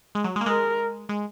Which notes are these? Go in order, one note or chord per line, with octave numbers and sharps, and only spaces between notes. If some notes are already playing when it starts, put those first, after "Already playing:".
G#3
F#3
G#3
A#3
G#3 A#4
G#3